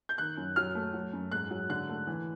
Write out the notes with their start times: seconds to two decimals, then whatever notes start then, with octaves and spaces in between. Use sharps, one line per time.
0.09 G6
0.18 D#3 F#6
0.37 F#2
0.56 F#3 F6
0.75 A3
0.94 F#3
1.13 F#2
1.32 G#2 F#6
1.51 F#3
1.69 D3 F#6
1.89 A3
2.07 E3